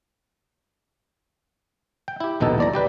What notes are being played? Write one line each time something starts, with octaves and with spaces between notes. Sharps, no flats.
G5
E4 G4
A#1 D#2 B2 D#4 A4
E2 D5 A#5
G3 G4 B4